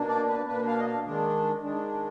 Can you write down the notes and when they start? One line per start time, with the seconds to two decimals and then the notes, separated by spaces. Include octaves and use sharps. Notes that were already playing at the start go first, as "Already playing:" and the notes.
Already playing: B2 A#3 D4
0.09 D5
0.29 B4
0.47 B2 A#3 D4 B4
0.67 F5
0.80 D#5
0.86 F5
1.05 D#3 G#3 D4
1.64 D#3 G#3 D4